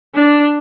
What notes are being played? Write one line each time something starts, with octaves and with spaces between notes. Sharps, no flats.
D4